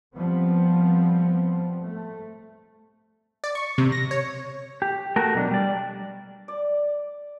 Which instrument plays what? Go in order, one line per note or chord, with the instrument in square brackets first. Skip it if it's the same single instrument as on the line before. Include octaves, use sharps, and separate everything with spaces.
[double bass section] F3 G3 B3 C4
A3
[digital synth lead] D5
C#6
C3
A#6
C#5
[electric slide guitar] G4
A3 F#4 A#4
B2 F#3 D4
G3 D5
[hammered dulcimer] D5